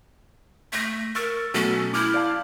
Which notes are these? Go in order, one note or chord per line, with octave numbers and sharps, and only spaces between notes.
A3 A#6 B6
A#4 C#6 E6 A6
B2 F#3 A3 C#4
E4 D6 F6 G6
D5 F5 A5